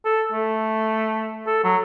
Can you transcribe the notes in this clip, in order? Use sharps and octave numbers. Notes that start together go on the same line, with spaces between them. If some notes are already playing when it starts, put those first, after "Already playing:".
A4
A3
A4
F#3